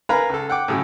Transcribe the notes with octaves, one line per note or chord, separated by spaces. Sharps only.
A#4 B4 F5 G#5 A#5 B5
C#2 A4
F#5 G5 D6
A2 C#3 F#3